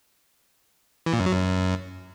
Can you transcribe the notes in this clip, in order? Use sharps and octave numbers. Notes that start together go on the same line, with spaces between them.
E3
A#2
F#2
F#3
F#2